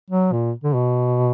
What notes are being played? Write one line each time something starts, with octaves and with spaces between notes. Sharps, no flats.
F#3
A#2
D3
B2